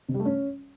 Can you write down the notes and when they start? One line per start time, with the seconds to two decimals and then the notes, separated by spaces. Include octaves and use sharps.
0.09 C3
0.14 G3
0.20 A3
0.25 C#4